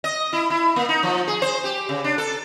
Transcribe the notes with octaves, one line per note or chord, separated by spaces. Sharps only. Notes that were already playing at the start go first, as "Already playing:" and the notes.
D#5
E4
E4
A#3
D#4
F3
G#4
C5
G4
C#3
D4
A4